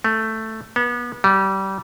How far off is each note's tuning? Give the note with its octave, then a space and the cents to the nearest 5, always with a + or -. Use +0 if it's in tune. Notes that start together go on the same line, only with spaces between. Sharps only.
A3 +5
B3 -30
G3 -25